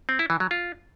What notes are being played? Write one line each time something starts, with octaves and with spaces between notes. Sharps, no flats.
C4
E4
E3
F#3
F4